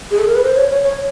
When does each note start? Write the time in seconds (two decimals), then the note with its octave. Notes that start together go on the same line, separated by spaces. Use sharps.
0.11 G#4
0.19 A4
0.27 A#4
0.35 B4
0.43 C5
0.56 C#5
0.69 C#5
0.82 C#5
0.95 C#5